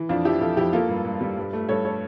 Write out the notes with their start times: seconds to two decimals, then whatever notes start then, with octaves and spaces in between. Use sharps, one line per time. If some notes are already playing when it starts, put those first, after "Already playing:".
Already playing: E3
0.09 F2 D4 F4
0.25 F3 E4 G4
0.41 F2 F4 A4
0.57 F2 E4 G4
0.73 A#3 F4 A4
0.89 G2
1.05 G2
1.21 G3
1.37 G2
1.53 A3
1.68 G2 A4 C#5
1.85 A4 C#5